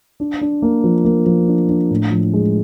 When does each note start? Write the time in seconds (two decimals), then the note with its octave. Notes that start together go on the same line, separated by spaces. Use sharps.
0.20 D4
0.41 D4
0.62 A#3
0.84 F3
1.05 A#3
1.26 F3
1.48 D4
1.69 D4
1.91 A2
2.11 F3
2.33 G#3